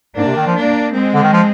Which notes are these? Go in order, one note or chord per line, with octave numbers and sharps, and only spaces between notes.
G#2 A#3 D4
C3
D#3
F3
A#3 D4
G#3 C4
D3
D#3
F3